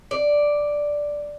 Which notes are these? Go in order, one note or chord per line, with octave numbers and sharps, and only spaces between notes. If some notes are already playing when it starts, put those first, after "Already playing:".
D5